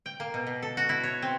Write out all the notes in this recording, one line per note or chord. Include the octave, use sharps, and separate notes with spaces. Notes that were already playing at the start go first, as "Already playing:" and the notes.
G5
A#3
B2
B2
A4
F#4
E4
C#5
C4